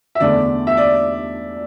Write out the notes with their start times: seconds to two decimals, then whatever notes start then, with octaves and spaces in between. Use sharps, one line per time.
0.15 E5
0.20 E2 D3 A3 D5
0.67 E5
0.77 D5